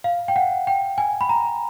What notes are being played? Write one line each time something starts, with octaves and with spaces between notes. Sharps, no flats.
F5
G5
F#5
G5
G#5
B5
A#5